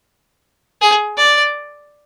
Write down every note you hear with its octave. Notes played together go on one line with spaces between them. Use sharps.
G#4
D5